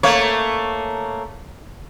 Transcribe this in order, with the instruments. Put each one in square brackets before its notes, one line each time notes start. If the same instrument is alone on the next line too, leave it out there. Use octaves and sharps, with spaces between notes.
[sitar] A3 A#3 C#5